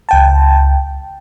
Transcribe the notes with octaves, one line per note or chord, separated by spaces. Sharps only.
C#2 G5 A5